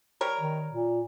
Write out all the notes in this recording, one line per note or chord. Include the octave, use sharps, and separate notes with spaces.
G3 A#4 C#5
D#3
A#2